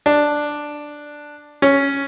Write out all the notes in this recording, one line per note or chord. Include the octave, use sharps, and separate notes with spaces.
D4
C#4